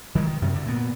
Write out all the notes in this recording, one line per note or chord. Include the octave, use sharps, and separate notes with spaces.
D#3 F3 G3 G#3
D#3
F#2 C3 D#3
D3
A#2 B3